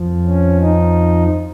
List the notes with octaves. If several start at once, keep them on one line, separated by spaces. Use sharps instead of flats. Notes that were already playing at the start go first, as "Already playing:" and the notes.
Already playing: F2 F3
C#4
D#4